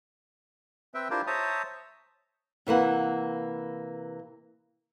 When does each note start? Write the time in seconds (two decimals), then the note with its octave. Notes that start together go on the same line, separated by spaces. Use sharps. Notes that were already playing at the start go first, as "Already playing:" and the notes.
0.94 C4 B4 E5 G5
1.10 D4 E4 F4 G4 A#4 C5
1.27 C5 C#5 E5 A5 A#5 D#6
2.67 C3 E3 A#3 F#5